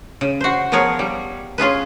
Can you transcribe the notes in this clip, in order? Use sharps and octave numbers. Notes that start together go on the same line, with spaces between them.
C#3
F#4 C5
F3 B3 G#4 A#4 C#5
G3
C#4 F4 G#4 B4